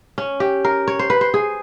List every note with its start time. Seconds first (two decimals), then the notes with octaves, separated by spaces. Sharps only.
0.18 C#4
0.40 G4
0.65 A#4
0.88 C#5
0.99 C5
1.10 B4
1.21 C5
1.34 G#4